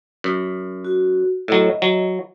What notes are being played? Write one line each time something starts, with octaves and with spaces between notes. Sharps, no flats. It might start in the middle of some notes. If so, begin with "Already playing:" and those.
F#2
F#4
A2 F#3 D#5 E5
F#3